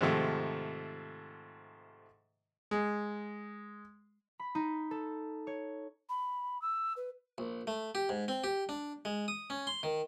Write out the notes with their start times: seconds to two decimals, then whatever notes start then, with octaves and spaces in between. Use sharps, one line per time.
0.01 G#2 C3 D#3 F3 A3
2.71 G#3
4.39 B5
4.55 D#4
4.91 A4
5.47 C#5
6.09 B5
6.62 E6
6.97 B4
7.38 A#1
7.67 A3
7.95 G4
8.09 G#2
8.28 C4
8.44 G4
8.69 D4
9.05 G#3
9.28 D#6
9.50 C#4
9.67 C6
9.83 D#3